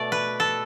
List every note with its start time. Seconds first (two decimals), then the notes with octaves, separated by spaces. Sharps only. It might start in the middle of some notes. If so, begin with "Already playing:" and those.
Already playing: B2 A3 D5
0.12 B4
0.40 A4